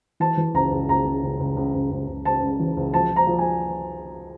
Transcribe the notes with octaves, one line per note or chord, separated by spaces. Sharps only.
E3 A5
E3
C#2 A#5
C#2
C#2 A#5
C#3
C#2
C#2
C#2
C#2
C#2
C#2
C#3 A5
C#2
E3
C#2
F3 A5
F3
A#5
F3
G#5